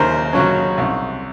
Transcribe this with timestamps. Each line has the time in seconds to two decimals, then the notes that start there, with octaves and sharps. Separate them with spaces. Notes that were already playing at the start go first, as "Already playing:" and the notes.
Already playing: D#2 C#3 F#3 A#4 C5
0.33 C#3 F#3 C#4
0.78 C2